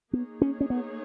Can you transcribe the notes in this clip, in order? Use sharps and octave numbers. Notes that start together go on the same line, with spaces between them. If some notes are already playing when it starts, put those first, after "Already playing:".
A#3 B3 D#4 G#4 C#5
C#4
C#4
B3